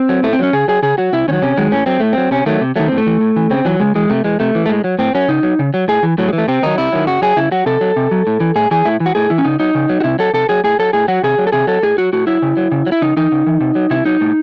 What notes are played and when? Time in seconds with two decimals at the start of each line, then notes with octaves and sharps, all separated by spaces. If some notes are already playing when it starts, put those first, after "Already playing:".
Already playing: C4
0.09 F#3
0.23 A2 A3
0.33 C4
0.39 F#3 C#4
0.53 C#3 G#4
0.68 F#3 G#4
0.83 C#3 G#4
0.98 F#3 F#4
1.13 C3 E4
1.28 D#3 C#4
1.33 F#3
1.42 C3 C#4
1.57 D#3 F#3 G#3
1.72 A2 C#4
1.86 F#3 C4
2.00 A2 A3
2.13 F#3 C4
2.31 C3 C#4
2.46 D#3 F#3 A3
2.61 C3
2.76 D#3 F#3 A3
2.88 A2 C4
2.98 A3
3.07 E3
3.20 A2
3.36 E3
3.50 C#3 C4
3.65 E3 F#3
3.80 C#3 G#3
3.95 E3 G#3
4.10 C3 A3
4.24 E3 G#3
4.40 C3 A3
4.55 E3
4.66 A3
4.69 A2 G#3
4.84 F#3
4.99 A2 C4
5.15 F#3 C#4
5.28 C#3 D#4
5.43 F#3
5.59 C#3
5.74 F#3
5.88 A2 G#4
6.03 E3
6.18 A2 F#3
6.28 G#3
6.33 E3
6.38 A3
6.48 C3 C4
6.63 D#3 F#3 D#4
6.78 C3 E4
6.92 D#3 F#3
7.07 C#3 F#4
7.22 F#3 G#4
7.37 C#3 E4
7.51 F#3 F#4
7.66 C3 A4
7.81 F#3
7.96 C3
8.11 F#3
8.27 A2
8.40 E3
8.56 A2 G#4
8.71 E3 G#4
8.85 A2 E4
9.00 E3
9.06 F#4
9.15 A2 G#4
9.30 E3 E4
9.38 C#4
9.44 C#3 D#4
9.60 F#3 D#4
9.75 C#3
9.89 F#3
10.00 F#4
10.04 C3 E4
10.19 F#3 A4
10.34 C3 A4
10.49 F#3 G#4
10.64 A2 G#4
10.79 F#3 A4
10.93 A2 G#4
11.08 F#3 F#4
11.24 C3 G#4
11.38 F#3
11.47 A4
11.52 C3 G#4
11.67 F#3 A4
11.83 A2 G#4
11.98 F#3 F#4
12.13 A2 F#4
12.27 F#3 E4
12.42 C#3
12.57 F#3
12.72 C#3
12.87 F#3
12.92 E4
13.02 C#3 D#4
13.17 E3 D#4
13.32 C#3
13.47 E3
13.60 C3
13.75 F#3
13.90 C3 E4
14.06 F#3 D#4
14.21 A2